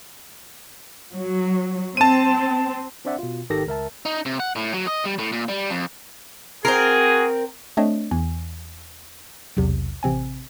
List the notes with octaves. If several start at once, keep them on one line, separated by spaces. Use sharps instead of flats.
F#3
C4 A5 D#7
C4 D4 C5 D5 E5 F#5
B2 F4
G#1 D#3 G4 A4 A#6
C#2 A#4 E5 A5
D#4
C3
F#5
A2
F#3
D#5
G3
A2
A#2
G3
F2
C4 F#4 G#4 A#4
A3 C4 D4 C#5 D#5
E2 E3 G#5
B1 E2 C3
A1 C3 C4 G#5